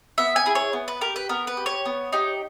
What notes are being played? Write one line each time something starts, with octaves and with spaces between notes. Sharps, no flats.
B3 E5
G#5
E4 G#4
C#5
B3
B4
G4 A#4
B4
B3 A#4
B4
G4
C#5
B3
D#4 G4